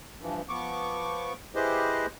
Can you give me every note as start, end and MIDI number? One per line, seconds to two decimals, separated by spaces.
0.21 0.42 43
0.21 0.42 52
0.21 0.42 53
0.49 1.33 53
0.49 1.33 59
0.49 1.33 85
0.49 1.33 86
1.55 2.06 64
1.55 2.06 67
1.55 2.06 68
1.55 2.06 71
1.55 2.06 72
1.55 2.06 75